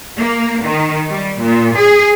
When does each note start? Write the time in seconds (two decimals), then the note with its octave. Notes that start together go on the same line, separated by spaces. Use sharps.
0.17 A#3
0.64 D#3
1.10 G3
1.40 A#2
1.77 G#4